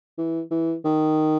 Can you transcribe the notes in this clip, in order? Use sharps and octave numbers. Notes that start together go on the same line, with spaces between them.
E3
E3
D#3